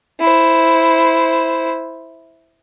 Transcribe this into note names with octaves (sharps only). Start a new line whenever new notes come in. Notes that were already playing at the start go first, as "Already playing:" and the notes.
E4 C5